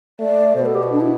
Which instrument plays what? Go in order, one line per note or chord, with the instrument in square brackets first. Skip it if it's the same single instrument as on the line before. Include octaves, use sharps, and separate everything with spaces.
[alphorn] A3 [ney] D5
[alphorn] B2 [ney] C5
[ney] A4
G4
F#4
D4
E4